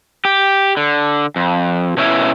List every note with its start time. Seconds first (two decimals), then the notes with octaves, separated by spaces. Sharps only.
0.25 G4
0.77 D3
1.36 F2
1.97 B2 C#4 E4